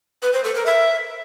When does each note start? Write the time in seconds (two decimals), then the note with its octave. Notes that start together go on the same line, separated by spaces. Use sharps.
0.22 B4
0.33 C5
0.44 A4
0.55 A#4
0.66 E5